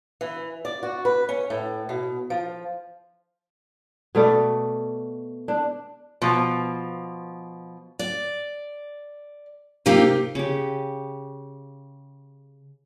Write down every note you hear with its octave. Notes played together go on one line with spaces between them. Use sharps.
E3
D5
F#4
B4
C#4
A2
B2
F3
B2 A3 D5
D4
B2 F3
D5
C3 A#3 D#4 F4 G4
C#3 G4